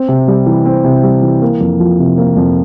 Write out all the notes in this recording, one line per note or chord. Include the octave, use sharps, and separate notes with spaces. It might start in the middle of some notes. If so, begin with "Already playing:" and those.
Already playing: C4
C3
G3
E3
C4
C3
G3
E3
A#3
F2
F3
C3
A#3
F2